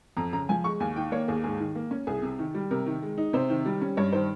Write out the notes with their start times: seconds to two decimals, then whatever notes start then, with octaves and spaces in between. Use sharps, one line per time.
0.17 F2 A#5
0.33 C#3 A#5
0.49 F3 G#5
0.64 G#3 C#6
0.80 D#2 G#5
0.96 D#3 G5
1.12 A#3 C#5
1.28 D#2 G#4
1.44 G#2 G#4
1.60 D#3
1.75 A#3
1.91 C#4
2.07 C2 G#4
2.22 C3
2.39 D#3
2.55 G3
2.71 C3 A#4
2.86 D#3
3.02 G#3
3.18 D#4
3.33 C3 C5
3.49 D#3
3.66 G3
3.81 C#4
3.97 G2 C#5
4.13 D#3 C5